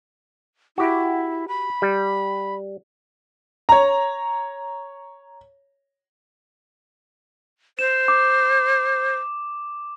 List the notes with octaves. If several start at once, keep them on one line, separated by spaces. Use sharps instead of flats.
E4 F#4 G4
B5
G3
C#5 A#5
C5 E7
D6